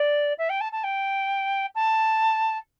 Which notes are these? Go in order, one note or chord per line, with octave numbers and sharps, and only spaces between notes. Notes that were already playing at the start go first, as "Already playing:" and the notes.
Already playing: D5
E5
G5
A5
A5
G5
A5